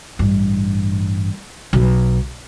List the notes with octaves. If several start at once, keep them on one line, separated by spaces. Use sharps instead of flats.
A1 G2
B1